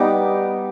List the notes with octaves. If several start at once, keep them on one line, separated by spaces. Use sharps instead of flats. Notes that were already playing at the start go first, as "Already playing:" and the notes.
Already playing: G3 B3 D#4 D6